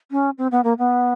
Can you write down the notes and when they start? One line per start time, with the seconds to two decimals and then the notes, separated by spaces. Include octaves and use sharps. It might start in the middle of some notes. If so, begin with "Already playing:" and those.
0.11 C#4
0.38 C4
0.52 B3
0.64 A#3
0.79 B3